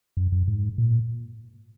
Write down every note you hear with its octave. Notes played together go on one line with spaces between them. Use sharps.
F#2
F#2
G#2
A#2